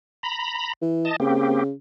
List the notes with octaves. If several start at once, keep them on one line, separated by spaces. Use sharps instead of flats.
A#5 B5
E3
D#5 A5
C#3 A#3 C4 G4